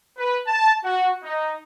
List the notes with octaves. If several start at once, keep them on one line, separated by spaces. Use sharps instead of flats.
B4
A5
F#4
D#4